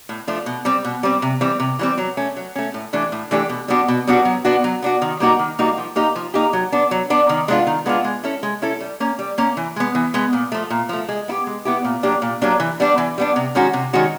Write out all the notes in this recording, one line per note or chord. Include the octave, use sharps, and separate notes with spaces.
A2
F3 A3 D4
B2
G3 C4
B2
G3 C4
C3
E3 G3 C4
C3
E3 G3 C4
F#3
A3 C#4
F#3
A3 C#4
A2
E3 A3 D4 G4
A2
E3 A3 D4 G4
B2
G3 B3 D4 F#4
B2
G3 B3 D4 F#4
F#3
B3 D4 F#4
F#3
B3 D4 F#4
D#3
G3 A#3 D#4 F#4
D#3
G3 A#3 D#4 F#4
F3
A#3 D#4 G4
F3
A#3 D#4 G4
F#3
B3 D4
F#3
B3 D4
D#3
G#3 B3 D4 F4
D#3
G#3 B3 D4 F4
G#3
C#4 E4 A4
G#3
C#4 E4 A4
G3
A#3 C#4
G3
A#3 C#4
E3
G#3 B3
E3
G#3 B3
A#2
F3 A3
A#2
F3 A3
G#3
B3 E4 G4
G#3
B3 E4 G4
A#2
F#3 A#3 D4 G4
A#2
F#3 A#3 D4 G4
E3
G3 B3 D4
E3
G3 B3 D4
C3
D#3 G#3 C#4 F#4
C3
D#3 G#3 C#4 F#4